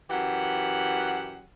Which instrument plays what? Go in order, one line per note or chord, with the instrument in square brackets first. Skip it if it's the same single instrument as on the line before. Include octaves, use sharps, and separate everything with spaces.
[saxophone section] F#2 E3 G4 F#5